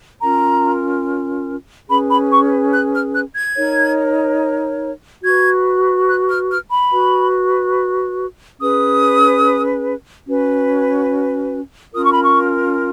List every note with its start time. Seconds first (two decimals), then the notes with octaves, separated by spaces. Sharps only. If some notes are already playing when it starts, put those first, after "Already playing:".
0.21 C#4 F4 A#4 A#5
1.89 C#4 G#4 B4 B5
2.10 B5
2.30 C#6
2.73 F#6
2.94 F6
3.14 F#6
3.35 G#6
3.56 D#4 A#4 C#5
5.23 F#4 B4 G#6
6.08 F#6
6.29 F6
6.50 F6
6.70 B5
6.92 F#4 B4
8.59 C#4 G#4 B4 D#6
10.27 C#4 F#4 B4
11.93 C#4 F4 A#4 D#6
12.03 C#6
12.12 B5
12.21 C#6